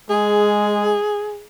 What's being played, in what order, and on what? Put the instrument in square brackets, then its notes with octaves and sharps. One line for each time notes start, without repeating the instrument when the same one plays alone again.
[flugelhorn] G#3 [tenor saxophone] G#4